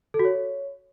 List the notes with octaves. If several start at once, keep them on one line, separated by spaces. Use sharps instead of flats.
A4
F#4
C#5